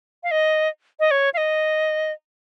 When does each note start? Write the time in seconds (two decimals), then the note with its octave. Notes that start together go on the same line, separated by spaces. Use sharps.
0.23 F5
0.31 D#5
1.00 D#5
1.11 C#5
1.34 F5
1.37 D#5